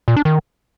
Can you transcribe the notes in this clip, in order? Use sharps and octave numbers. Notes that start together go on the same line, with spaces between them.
A#2
D4
D#3